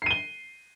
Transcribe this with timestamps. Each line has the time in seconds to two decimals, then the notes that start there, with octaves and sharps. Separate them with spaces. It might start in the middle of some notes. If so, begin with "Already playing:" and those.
0.02 C7
0.06 D#7
0.11 G7